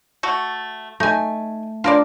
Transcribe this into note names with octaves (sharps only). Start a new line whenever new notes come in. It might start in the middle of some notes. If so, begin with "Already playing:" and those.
A3 F#4
A3 D#4 G#5
D4 F4 A#4 D5